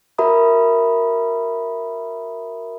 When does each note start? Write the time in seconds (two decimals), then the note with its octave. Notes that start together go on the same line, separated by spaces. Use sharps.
0.18 F#4 A#4 E5 A#5 B5 D#6